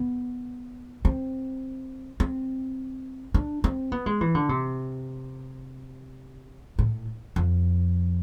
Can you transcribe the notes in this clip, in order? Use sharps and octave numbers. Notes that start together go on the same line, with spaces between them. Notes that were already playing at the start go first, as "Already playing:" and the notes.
Already playing: B3
C4
C4
D4
C4
B3
G#3
E3
D3
C3
A2
F2